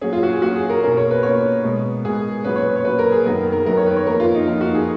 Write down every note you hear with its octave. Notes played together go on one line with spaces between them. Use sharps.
A#2 F#3 C#4 G#4
F4
F#4
G#4
A#2 F#3 C#4 F#4
G#4
A#4
B2 A#3 C#4 A#4
C#5
B4
B2 A#3 C#4 C#5
B2 G#3 B3
B2 G#3 B3 G#4
A#2 F#3 C#4 B4
C#5
B4
C#5
A#2 F#3 C#4 B4
A#4
G#4
F#2 D#3 F#3 B3 A#4
A#4
F#2 D#3 F#3 B3 A#4
C#5
B4
C#5
F2 F3 A#3 A#4
F4
D#4
F2 F3 A#3 D#4
F#4
G#4